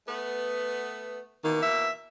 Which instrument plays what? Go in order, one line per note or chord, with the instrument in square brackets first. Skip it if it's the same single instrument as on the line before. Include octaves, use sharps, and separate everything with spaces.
[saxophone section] A3 B3
[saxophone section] B2 E3 A#3 [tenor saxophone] D#3
[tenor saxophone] E5